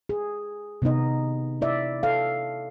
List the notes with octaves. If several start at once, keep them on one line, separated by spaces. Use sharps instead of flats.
G#4
C3 B3 C4 D#4 D#5
E4 D5 E5
A4 F5